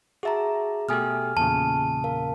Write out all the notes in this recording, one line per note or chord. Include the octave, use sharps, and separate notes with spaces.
F#4 G#4 E5 A5 A#5
B2 A3 G4 G#5 D#6 F6
E2 A#2 C#3 A5
A#4 F5